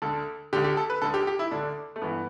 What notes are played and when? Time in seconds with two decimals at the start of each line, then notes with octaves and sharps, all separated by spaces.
0.02 D2 D3 A4
0.53 D2 D3 G4
0.64 G4
0.77 A4
0.90 B4
1.02 D2 D3 A4
1.14 G4
1.27 G4
1.39 E4
1.51 D2 D3 D4
1.96 A3
2.02 G2 E3 B3